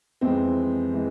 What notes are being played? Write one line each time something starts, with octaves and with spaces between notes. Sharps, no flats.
F2 E3 G#3 C4
E3 G#3